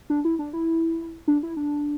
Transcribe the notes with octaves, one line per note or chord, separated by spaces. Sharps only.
D4
E4
D4
E4
D4
E4
D4